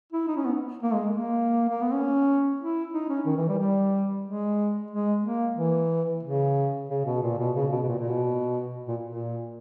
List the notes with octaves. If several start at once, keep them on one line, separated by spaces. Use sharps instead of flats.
E4
D#4
C#4
B3
A#3
G#3
A#3
A#3
B3
C#4
E4
D#4
C#4
D#3
E3
G3
G3
G#3
G#3
A#3
E3
C#3
C#3
B2
A#2
B2
C#3
B2
B2
A#2
A#2
B2
A#2
A#2